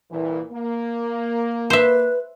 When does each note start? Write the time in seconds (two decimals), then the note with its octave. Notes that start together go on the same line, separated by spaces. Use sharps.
0.11 C2 A#2 E3
0.53 A#3
1.70 B4 C5 E5